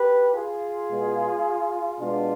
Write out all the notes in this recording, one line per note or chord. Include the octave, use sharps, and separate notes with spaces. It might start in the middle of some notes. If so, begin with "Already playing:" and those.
Already playing: G4 B4
F4 G#4
B2 G#3
B2 G#3 D4 F4